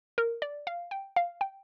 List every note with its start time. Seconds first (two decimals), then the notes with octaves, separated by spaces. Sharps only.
0.18 A#4
0.42 D5
0.67 F5
0.91 G5
1.16 F5
1.41 G5